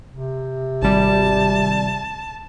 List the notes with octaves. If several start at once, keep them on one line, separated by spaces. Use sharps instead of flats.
C3
G#1 G3 A5